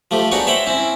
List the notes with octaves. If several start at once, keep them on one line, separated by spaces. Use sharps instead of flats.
F3 A3 G4
B3 D4 D#4 F#4 G#4 C#5
C5 C#5 E5 G5 B5
C4 C#4 E4